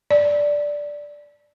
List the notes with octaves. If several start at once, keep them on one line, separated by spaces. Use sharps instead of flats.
D5